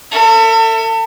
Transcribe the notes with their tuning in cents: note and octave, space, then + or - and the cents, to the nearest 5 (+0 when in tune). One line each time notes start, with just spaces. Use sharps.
A4 +40 E5 +0